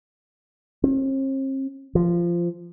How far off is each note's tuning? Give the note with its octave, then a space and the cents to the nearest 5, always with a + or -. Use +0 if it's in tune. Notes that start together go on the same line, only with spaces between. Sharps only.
C4 +45
F3 -15